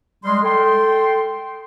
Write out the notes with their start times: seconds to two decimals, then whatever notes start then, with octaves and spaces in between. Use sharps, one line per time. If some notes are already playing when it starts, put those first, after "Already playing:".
0.24 G3 G#3 C6
0.43 A4 G5 C6